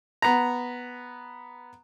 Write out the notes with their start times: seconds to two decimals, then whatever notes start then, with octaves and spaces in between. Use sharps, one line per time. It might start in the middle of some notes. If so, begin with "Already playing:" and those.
0.22 B3 A#5